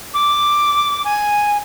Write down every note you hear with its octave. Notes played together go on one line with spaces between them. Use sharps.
D6
G#5